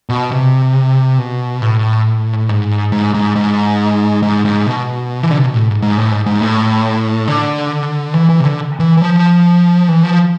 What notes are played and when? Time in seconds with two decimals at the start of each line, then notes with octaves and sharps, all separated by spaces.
0.09 B2
0.31 C3
1.18 B2
1.62 A2
2.49 G#2
2.92 G#2
3.14 G#2
3.36 G#2
4.23 G#2
4.45 G#2
4.67 B2
5.23 E3
5.31 D3
5.38 C3
5.46 B2
5.54 A2
5.68 G#2
5.82 G#2
5.98 A2
6.11 G#2
6.26 G#2
6.41 A2
7.28 D3
8.15 E3
8.29 E3
8.40 C3
8.44 D3
8.80 E3
8.97 E3
9.02 F3
9.88 E3
10.03 F3